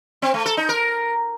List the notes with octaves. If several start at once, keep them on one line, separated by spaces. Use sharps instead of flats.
C4
A3
A4
D#4
A#4